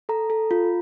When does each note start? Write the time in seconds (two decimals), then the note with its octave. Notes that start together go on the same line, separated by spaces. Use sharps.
0.09 A4 A#5
0.30 A4
0.51 F4